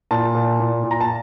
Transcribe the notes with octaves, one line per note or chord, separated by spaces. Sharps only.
A#2 A5
A#2
A#2
A#2
A#5
A5